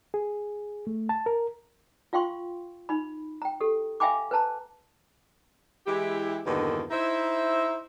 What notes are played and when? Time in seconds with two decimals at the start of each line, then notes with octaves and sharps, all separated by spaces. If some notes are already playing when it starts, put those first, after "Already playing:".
0.14 G#4
0.87 A3
1.09 A5
1.26 A#4
2.13 F4 F5 G5 C6 C#6
2.89 D#4 B5
3.42 G5 A#5
3.61 G4 A4
4.00 E5 F5 G5 G#5 B5 D6
4.31 B4 C5 A5 A#5
5.86 E3 G#3 E4 G4
6.45 E2 G2 B2 D3 D#3 A#3
6.90 D#4 E4 C5 E5